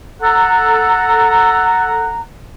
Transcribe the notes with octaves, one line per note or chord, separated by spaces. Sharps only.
A4 F#5 A#5